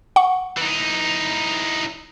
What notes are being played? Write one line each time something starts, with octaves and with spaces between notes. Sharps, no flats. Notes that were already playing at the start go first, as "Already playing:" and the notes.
F#5 C#6
E3 D#4